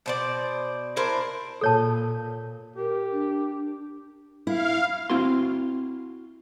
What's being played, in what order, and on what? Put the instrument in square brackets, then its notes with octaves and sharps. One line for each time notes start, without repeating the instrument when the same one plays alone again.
[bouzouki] B2 C5 D5
D4 E4 A#4 C5
[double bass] A#2 [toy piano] A4 C#5 A5
[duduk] G4 [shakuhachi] A#4
[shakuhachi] D4
[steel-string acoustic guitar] E4 [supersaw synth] F5
[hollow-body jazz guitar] C4 E4 F#4 C6